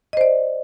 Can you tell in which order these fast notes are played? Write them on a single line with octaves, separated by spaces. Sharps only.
D#5 C5 D5